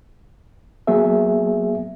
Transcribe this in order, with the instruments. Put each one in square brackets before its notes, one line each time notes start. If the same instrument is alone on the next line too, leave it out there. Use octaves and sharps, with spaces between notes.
[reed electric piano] F#3 A#3 B3 G#4 E5